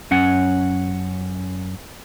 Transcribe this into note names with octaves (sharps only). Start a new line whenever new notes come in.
F#2 C#4 F#5